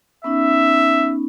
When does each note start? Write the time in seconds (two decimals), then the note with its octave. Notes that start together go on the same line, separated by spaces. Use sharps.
0.24 B3 C#4 D#4 E5